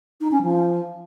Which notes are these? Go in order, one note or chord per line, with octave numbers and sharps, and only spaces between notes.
D#4
C#4
F3